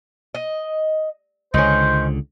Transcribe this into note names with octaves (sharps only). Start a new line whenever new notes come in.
D#5
C#2 D3 D#3 C#4 C5